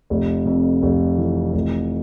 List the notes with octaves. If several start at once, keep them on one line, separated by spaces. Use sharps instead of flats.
F1
F2
F1
E3
F1